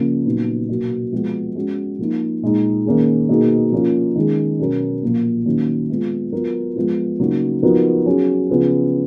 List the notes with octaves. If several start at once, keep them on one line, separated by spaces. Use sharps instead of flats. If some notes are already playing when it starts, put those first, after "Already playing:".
Already playing: C#3 F3 A#3
A#2 F#3 B3 D#4
B2 F#3 A#3
F3 G#3 B3 F#4
G#3 C#4 F#4
F3 A#3 D#4
A#2 G#3 D#4
D#3 A#3 C#4 G#4
B2 A#3 D#4 G#4
F3 A#3 C#4 F4
D#3 G#3 C#4 G#4
B2 F#3 C#4 F#4 A#4
A#2 F3 A#3
D#3 F#3 A#3 C#4
G#3 B3 F4
F#3 B3 F4 A#4
F3 G#3 B3 F4
C#3 F#3 A#3 D#4 F#4
F3 B3 D#4 F#4 A#4
F#3 C#4 G#4
C#3 F3 B3 F4 G#4